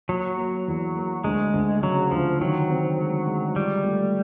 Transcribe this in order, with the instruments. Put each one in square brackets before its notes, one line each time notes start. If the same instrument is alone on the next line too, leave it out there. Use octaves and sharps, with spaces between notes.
[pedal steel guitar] F#3 [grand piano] A#3
[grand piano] A#3
E2
A#3
[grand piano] D2 [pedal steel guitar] G#3
[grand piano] D2
[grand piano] C#3 [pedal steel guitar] F#3
[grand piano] D2 [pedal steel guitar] F3
[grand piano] D#3 [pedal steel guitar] F#3
[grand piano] C4
G#3
G#3
[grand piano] F3 [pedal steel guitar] G3
[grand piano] A3